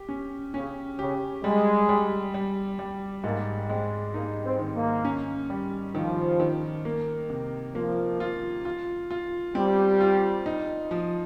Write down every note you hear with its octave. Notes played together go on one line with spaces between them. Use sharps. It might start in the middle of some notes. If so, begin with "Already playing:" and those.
Already playing: G4
C#4
C#3 C#4
C#3 G4
G3 G#3
G3
G3
G3
G#2 A#3
G#3 C4
A#3 D#4
C4
D#3
A#3
C#4
G3
D#3 F3
D#3
A#3
C3
F3 A#3
F4
F4
F4
G3 C4
F4
D#4
F3